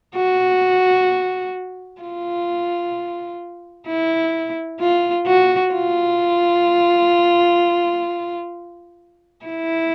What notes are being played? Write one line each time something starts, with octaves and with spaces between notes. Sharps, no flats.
F#4
F4
E4
F4
F#4
F4
E4